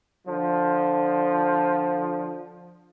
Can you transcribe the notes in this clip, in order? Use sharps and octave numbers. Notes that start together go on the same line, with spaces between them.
D3 F3